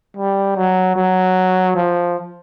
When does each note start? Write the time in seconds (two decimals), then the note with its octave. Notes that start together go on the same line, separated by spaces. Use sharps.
0.17 G3
0.56 F#3
0.96 F#3
1.75 F3